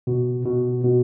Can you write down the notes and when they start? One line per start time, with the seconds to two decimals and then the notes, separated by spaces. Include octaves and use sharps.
0.07 B2
0.45 B2
0.84 B2